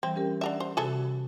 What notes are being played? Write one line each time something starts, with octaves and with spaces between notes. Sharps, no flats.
E3 G3 C4
C#4 G4 A#4
D4 A#4 E5 F#5
C5
C3 F#4 G#4 A4 E5